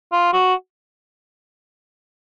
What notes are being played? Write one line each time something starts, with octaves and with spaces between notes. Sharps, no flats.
F4
F#4